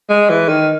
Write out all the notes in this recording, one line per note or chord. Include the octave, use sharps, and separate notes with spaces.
G#3
E3
D#3